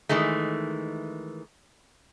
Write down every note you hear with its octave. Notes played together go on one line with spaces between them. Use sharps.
D#3 E3 G#3 A3